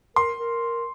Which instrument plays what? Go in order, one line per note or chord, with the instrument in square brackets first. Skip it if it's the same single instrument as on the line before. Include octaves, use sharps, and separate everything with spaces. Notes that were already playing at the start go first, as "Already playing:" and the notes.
[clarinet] A#4 [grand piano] C6
[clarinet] A#4